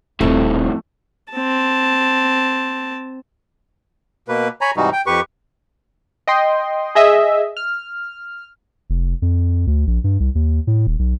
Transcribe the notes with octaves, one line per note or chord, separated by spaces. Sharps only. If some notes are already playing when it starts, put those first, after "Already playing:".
D#1 F2 A2 A3 C4 A4
C4 A5
B2 A#3 B4
C#5 G#5 A#5 B5
G#2 C3 E3 G3 D#4 F#4
G5
F2 G4 B4 C#6
D#5 G5 C6
G#4 D#5 E5
F6
F1
F2
D2
A#1
G2
C2
D#2
A2
D#1
B1